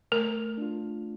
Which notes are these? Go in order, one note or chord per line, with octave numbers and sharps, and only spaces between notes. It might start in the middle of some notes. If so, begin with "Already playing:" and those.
A3 A#4
D4 F4